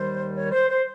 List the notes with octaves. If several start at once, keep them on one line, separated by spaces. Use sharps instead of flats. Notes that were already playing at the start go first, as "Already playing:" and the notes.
Already playing: D#2 D#3 G3 C5
C#5
C5
C5